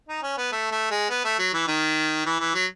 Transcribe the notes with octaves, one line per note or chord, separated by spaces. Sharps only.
D#4
C#4
B3
A3
A3
G#3
B3
A3
F#3
E3
D#3
E3
E3
F#3